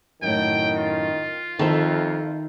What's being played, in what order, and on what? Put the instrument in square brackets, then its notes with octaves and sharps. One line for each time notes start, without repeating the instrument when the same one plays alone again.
[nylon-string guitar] F#2 A2 [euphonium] D#3 [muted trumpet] G5
[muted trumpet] F4
[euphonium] F2 [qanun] D#3 E5 [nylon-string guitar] E4 A4 C5